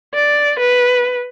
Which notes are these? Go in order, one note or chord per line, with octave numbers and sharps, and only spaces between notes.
D5
B4